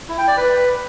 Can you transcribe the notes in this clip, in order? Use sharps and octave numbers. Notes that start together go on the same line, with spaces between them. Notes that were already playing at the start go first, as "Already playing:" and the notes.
E4
G5
D5
B4